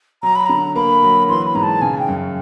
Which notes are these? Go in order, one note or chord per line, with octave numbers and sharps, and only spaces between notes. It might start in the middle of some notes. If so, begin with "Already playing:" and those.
F#3 A#5
B5
D3 A#5
A#3 B5
F#3
E3 C6
B5
G#2 A#5
A5
C#3 G#5
G5
F#2